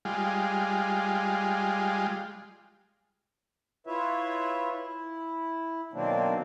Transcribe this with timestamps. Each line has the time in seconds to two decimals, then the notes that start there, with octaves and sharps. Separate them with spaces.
0.05 G3 G#3 F4
3.87 E4 F4 B4 C#5 E5
4.71 E4
5.93 B2 D#3 F#3 A#3 C4 D4